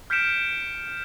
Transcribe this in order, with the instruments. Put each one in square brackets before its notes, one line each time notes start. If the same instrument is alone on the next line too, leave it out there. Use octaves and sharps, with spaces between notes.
[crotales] F6 G6 B6 C#7 D7 E7